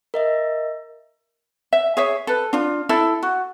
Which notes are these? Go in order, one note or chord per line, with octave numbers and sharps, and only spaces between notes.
A#4 D#5 E5
E5
G#4 C#5 E5
A4 B4
D4 F4
E4 A4
F#4